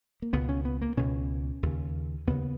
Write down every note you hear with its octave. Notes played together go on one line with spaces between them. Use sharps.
A#3
C#2 B2 B3
C#4
B3
A#3
C#2 B2 C#4
D#2 C#3
D#2 C#3 B3